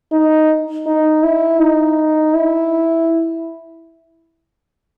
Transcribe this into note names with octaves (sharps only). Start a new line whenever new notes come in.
D#4
D#4
E4
D#4
E4